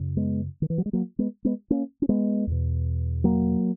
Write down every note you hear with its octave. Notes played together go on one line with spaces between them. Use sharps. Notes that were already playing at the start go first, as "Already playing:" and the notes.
Already playing: F#2 C#3
G#3 B3
D#3
E3
F#3
G#3
F#3 A#3
G#3 B3
G#3 B3
A#3 C#4
C#4
G#3 B3
E2 B2
F#3 A#3